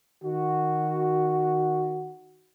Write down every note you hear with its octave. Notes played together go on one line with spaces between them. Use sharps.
D#3 F#4